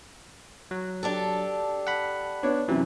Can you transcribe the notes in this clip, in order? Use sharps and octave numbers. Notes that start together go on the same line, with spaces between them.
F#3
D4 G4 A4
F#5 B5
B3 D4 C#5
F#2 C3 E3 F#3